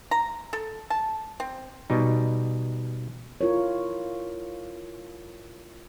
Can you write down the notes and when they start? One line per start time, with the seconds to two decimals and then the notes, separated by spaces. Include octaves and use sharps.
0.11 A#5
0.53 A4
0.90 A5
1.40 C4
1.90 B2 G3 D#4
3.41 E4 F4 A#4 C#5